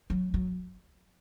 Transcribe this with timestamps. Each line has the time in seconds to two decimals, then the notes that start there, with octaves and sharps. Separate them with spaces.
0.10 F#3
0.34 F#3